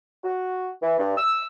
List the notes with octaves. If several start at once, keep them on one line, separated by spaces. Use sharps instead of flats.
F#4
E3
G2
E6